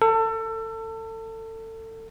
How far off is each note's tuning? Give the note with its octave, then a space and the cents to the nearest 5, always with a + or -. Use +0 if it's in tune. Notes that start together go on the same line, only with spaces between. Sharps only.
A4 +30